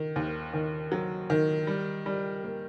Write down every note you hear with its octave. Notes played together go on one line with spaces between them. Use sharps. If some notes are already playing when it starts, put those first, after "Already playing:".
Already playing: D#3
D#2
D#3
F#3
D#3
G3
G3
A#3